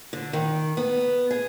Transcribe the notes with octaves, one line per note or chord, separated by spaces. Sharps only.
D3
D#3
B3
G#4